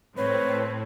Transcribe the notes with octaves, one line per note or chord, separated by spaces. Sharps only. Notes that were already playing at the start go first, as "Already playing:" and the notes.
A2 C4 B4 C#5